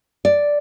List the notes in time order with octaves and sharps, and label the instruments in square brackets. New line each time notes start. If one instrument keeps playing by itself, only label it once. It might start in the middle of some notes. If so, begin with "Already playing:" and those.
[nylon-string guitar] D5